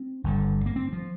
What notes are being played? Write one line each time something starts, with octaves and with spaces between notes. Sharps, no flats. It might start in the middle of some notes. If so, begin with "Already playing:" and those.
Already playing: C4
G1 G2 D3
A#3
C4
F3